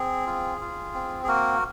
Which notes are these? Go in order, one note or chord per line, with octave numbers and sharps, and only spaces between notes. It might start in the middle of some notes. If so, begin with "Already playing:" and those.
Already playing: C4 G#4
F4
F4
C4
G#4
A#3 F#4 A#4